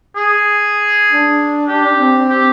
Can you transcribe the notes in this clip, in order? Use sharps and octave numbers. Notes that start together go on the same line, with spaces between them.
G#4
D4
G4
C4
G4